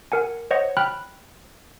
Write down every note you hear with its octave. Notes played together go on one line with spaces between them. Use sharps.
A#4 F#5 G#5
C5 C#5 D#5 F#5
G5 B5 F6 F#6